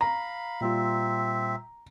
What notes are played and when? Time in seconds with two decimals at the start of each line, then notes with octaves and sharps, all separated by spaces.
0.01 F5 A#5 B5
0.61 A#2 G3 C4 F4 E5